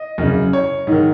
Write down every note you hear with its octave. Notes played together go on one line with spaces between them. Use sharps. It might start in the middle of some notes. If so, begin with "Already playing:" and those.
Already playing: D#5
F#2 C#3
C#5
G#2 D#3